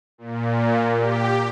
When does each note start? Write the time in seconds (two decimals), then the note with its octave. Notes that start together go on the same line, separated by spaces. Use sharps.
0.18 A#2
0.96 G4